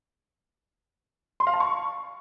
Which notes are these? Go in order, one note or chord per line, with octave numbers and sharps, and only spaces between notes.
C6
F5
A5
C#6